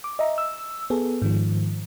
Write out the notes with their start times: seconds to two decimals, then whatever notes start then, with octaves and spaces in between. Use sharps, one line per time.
0.04 D6
0.19 D#5 E5 A#5
0.38 E6
0.90 B3 G#4 A4
1.22 G#2 D#3 F3